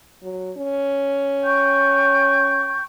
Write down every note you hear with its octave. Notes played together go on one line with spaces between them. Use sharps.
F#3
C#4
G5 C#6 G6